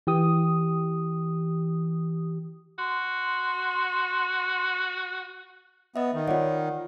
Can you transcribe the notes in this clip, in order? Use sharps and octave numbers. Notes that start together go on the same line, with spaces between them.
E3 G4 D#6
F#4 C6
B3 D#5 E5
D#3
F4 C#5 D5 F#5